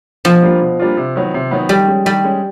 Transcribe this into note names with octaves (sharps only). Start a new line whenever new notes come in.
B2 F3
G3 A#3 D4 F4
B2
G3 A#3 D4 F4
C3
D#3 F#3 B3
C3
D#3 F#3 B3
D#3 G3
G#3 C#4
D#3 G3
G#3 C#4